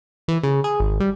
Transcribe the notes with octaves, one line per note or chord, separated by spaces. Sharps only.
E3
C#3
G#4
G#1
G3